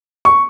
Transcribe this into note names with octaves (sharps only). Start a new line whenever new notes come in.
C#6